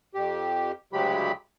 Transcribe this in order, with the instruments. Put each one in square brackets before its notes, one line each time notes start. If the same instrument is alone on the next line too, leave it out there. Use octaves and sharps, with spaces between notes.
[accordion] F2 G4
D2 C#3 F#3 G#3 G4 B5